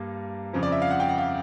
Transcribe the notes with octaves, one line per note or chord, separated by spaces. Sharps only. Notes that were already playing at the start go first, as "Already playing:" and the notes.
Already playing: G2 G3 A#3
F2 C#3 F3
D5
E5
F5
F#5
G5
F#5
F5